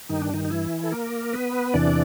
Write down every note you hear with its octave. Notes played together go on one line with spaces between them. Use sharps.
G2 D#3 D#4
D4
D#3 D#4
D#4
E3 E4
A4
A#3 A#4
B3 B4
E2 C3 E3 D4 D5